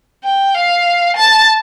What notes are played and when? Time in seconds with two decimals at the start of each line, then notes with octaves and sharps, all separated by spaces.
0.24 G5
0.55 F5
1.16 A5